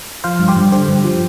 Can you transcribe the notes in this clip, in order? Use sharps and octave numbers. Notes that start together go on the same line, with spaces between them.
F3 C5 F5
G2
G4 C5
G2
D3 G4 C5
G2
F3